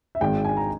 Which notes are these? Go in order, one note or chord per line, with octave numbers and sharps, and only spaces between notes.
E5
G#1 G#2 D#3 G#3 G5
G#5
A#5